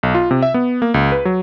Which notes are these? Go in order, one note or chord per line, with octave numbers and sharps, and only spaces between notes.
B1
F4
C3
E5
B3
A#3
C#2
B4
F#3